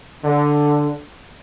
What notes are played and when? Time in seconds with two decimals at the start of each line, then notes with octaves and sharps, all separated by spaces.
0.24 D3